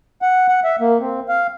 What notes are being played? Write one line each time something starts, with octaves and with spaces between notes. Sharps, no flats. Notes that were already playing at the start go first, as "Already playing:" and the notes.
F#5
F#5
E5
A#3
C4
F5